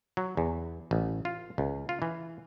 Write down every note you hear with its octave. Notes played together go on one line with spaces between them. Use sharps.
F#3
E2
A1
F4
C#2
F4
E3